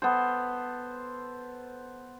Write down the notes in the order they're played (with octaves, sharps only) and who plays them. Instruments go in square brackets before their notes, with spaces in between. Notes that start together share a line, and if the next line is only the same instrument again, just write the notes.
[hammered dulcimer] B3 A4 C5